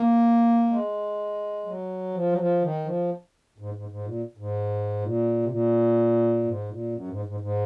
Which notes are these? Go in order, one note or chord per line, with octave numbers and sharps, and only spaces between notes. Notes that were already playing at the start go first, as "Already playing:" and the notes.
Already playing: A#3
G#3
F#3
F3
F#3
F3
D#3
F3
G#2
G#2
G#2
A#2
G#2
A#2
C3
A#2
G#2
A#2
F#2
G#2
G#2
G#2